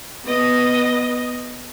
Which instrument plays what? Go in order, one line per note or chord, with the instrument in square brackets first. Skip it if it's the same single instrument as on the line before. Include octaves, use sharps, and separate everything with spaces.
[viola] B3 D#5